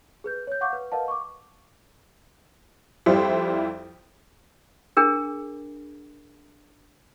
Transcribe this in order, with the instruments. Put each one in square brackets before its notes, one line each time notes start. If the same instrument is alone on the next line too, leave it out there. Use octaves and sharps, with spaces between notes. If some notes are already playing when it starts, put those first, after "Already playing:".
[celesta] G#4 B4 G6
C#5 G6
F5 F#5 C#6 D6 G6
B4
A#4 B4 D#5 F5 F#5 A5
C#6 D6
[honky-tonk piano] F2 G3 E4 F4 C5
[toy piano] D4 G#4 A#4